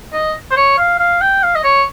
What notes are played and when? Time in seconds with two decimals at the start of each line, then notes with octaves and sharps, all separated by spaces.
0.13 D#5
0.51 C5
0.57 C#5
0.78 F5
1.00 F5
1.21 G5
1.43 F5
1.56 D#5
1.64 C#5